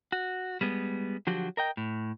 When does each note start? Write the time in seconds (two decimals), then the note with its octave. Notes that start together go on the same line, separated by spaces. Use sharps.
0.12 F#4
0.61 G3 G#3 B3
1.27 D3 F3 F#3 F#4 G4
1.57 A#4 D#5 G5
1.77 A2